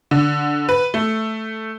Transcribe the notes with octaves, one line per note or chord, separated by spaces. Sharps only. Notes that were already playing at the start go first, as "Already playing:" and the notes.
D3
B4
A3